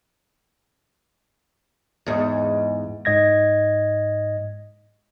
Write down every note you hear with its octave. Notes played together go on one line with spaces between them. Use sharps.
E2 G#2
G#2 D#5 G#6 A#6